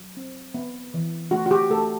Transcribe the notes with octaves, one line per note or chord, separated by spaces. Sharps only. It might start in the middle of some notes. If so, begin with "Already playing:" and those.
Already playing: F#3
C4
B3
E3
A3 F#4
F#4
G4
A3 A4